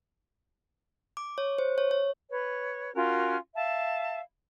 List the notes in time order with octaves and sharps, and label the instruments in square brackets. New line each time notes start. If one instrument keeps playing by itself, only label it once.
[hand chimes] D6
C#5
C5
C#5
C#5
[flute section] B4 C#5
C#4 F4 F#4 A#4
E5 F5 A5